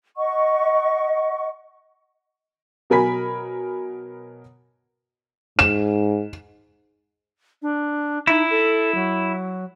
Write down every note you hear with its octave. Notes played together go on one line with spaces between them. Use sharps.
D#5 F#5 C#6
B2 F#3 A#4 G#5 B5 B6
G#2 E7
D4
D#4 E4
A4
F#3